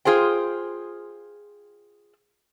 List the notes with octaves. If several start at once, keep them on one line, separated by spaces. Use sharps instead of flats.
F4 G#4 C5 G5